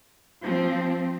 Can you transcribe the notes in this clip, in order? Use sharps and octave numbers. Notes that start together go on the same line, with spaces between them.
F3 C4